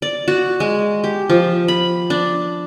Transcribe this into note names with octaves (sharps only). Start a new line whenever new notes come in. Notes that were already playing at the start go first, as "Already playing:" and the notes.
D5
F#4
G#3
G4
F3
B5
D4